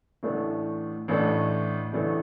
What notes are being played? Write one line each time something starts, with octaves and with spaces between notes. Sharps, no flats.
A1 A2 E3 A3 D4
A1 A2 E3 A3 D4
A1 A2 E3 A3 D4